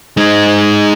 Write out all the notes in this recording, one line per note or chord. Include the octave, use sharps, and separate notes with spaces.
G#3 D#4